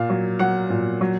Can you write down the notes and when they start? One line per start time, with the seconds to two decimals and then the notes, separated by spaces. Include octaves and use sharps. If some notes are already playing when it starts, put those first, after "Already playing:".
Already playing: A#2 F5
0.10 F#3
0.39 F#3 F#5
0.70 A#2
1.01 F#3